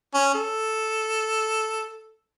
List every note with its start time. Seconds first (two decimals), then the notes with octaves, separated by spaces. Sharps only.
0.14 C#4
0.35 A4